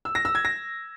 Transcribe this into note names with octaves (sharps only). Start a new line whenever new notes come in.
E6
A#6
E6
G#6
A#6